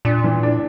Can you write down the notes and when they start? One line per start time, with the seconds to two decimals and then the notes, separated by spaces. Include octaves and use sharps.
0.05 A#2 D4
0.24 E3
0.43 D4